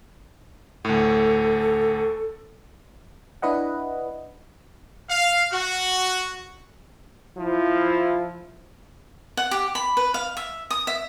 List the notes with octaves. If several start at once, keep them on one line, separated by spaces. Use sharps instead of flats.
D2 A2 A4
D4 E4 B4 D#5 F#5
F5
F#4
F3 E4
F#5
G4
B5
B4
F5
E5
D#6
E5